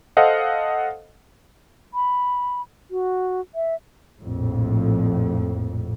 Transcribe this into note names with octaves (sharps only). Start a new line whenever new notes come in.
A4 C5 D#5 F5 F#5
B5
F#4
E5
A#1 F2 A2